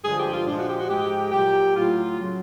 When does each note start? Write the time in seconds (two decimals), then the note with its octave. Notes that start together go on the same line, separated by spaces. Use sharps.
0.03 G2 D3 F3 G#3 G#4
0.18 G4
0.33 F4
0.46 A#2 F3 G#3 D4
0.58 F#4
0.68 G4
0.79 F#4
0.89 G#2 F3 G#3 G4
1.32 A#2 F#3 G4
1.75 A2 F#3 F4
2.18 C#3 F#3